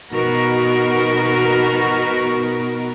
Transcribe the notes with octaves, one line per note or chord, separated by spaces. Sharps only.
B2 B3 D#4 F#4 A#4